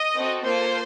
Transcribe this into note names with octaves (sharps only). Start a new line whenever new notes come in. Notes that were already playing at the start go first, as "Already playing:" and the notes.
Already playing: D#5
C4 F#4 A4
A#3 F4 A4 C5